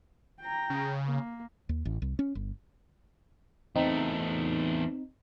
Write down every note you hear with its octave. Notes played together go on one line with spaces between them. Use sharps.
G5 A#5
C#3
A#3
D#2
A1
C2
C#4
G1
E2 A3 C4 D#4